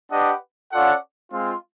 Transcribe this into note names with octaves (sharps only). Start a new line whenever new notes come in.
D4 G4 B4 D#5 F#5
C#4 F4 A4 D5 F#5
G#3 C4 F4